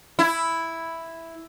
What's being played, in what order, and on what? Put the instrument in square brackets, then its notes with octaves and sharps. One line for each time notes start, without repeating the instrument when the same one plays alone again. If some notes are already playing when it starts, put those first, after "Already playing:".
[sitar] E4